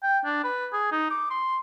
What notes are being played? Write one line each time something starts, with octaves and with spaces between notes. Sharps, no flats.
G5
D4
B4
G#4
D#4
D6
C6